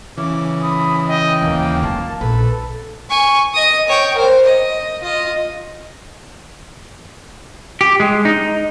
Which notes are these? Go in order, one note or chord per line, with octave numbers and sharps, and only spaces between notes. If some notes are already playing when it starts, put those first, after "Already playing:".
C#3 E3 D6
B5 D#6
D#5 G5
D#2 A#3
F#3 F4 A5
A#1 A4 B4
G#5 C#6
D#5 D#6
C#5 G5
A#4 C5
D#5
F4 D#5
G4
G#3
D#4